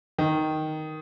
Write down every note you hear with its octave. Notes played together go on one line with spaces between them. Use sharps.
D#3